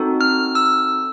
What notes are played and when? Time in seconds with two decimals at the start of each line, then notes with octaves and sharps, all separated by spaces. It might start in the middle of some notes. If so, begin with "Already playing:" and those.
Already playing: C4 D#4 F#4 A4
0.21 F6
0.55 E6